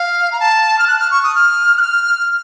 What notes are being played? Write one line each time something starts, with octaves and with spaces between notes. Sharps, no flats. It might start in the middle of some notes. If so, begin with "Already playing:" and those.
Already playing: F5
A#5
A5
F6
F#6
F6
C#6
D#6
F6
F#6
F6